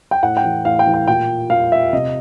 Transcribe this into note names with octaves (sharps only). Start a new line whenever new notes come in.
G5
A2 F#5
G5
E3
A2 F5
G5
E3
G5
A#2 G5
A#2 F5
E5
C3 D#5